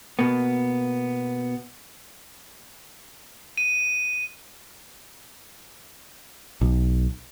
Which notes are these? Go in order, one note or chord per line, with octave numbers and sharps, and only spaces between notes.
B2 A#3 B3
D#7
B1